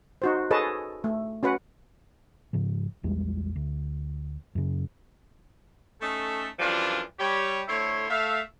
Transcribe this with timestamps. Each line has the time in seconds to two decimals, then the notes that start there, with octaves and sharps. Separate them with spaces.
0.22 D#4 F#4 C5
0.51 G#4 A4 B4 C#5 D#5 A5
1.04 A3
1.43 C#4 F#4 B4 F#5
2.53 G#2 C#3 F3
3.03 A#1 E2 G3 G#3
3.56 D2
4.55 F#2 C#3
6.01 A3 C#4 D#4 A4
6.59 F#2 E3 F3 G3 D4 F4
7.20 G3 G4 C#5
7.68 D3 A3 E4 C5 C#5
8.10 A3 E5 F5